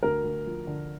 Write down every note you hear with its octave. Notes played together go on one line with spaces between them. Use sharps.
D2 A#4
D2
F3
D3